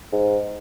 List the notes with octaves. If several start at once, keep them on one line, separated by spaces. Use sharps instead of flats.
G#2